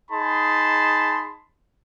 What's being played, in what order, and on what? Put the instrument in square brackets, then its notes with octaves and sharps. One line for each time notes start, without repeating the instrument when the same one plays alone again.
[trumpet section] D#4 G#4 A5 B5 C6